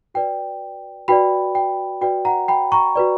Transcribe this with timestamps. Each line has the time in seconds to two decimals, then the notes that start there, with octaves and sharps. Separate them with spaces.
0.14 F#4 B4 D5 G5
1.08 F#4 B4 D5 G5 B5
1.55 G5
2.01 F#4 B4 D5 G5
2.25 F#5 A#5
2.48 G5 B5
2.72 A#5 C#6
2.96 F#4 B4 D5